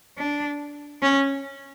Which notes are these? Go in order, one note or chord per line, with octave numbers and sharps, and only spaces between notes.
D4
C#4